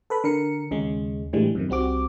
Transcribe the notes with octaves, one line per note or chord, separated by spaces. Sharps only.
A4 B4 B5
D3 A#4 C#7
D#2 C#3 G#3
A2 D3 E3 G3 G#3
F#2 C3 D#3
C2 G3 C4 F#4 D6